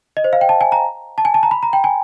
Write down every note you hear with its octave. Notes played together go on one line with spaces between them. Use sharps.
D#5
C5
F5
G5
A5
G#5
A#5
A5
G#5
A5
A#5
B5
A#5
G5
G#5